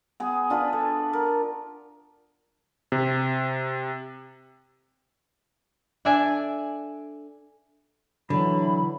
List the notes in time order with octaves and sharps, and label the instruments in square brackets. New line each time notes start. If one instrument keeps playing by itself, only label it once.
[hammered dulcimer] B3 G#4
D4 F4 B4
A4
A#4
[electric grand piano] C3
[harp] D4 A4 D5 E5 G#5
[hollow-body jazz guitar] D3 [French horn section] E3 F#3 [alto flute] B5